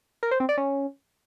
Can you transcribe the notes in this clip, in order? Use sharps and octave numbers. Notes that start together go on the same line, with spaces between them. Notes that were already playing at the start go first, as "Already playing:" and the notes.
A#4
C5
C4
D5
C#4